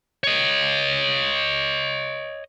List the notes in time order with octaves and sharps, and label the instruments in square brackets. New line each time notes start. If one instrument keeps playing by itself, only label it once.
[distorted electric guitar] C#5 D#5